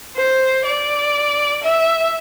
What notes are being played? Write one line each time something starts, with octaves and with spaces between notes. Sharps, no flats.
C5
D5
E5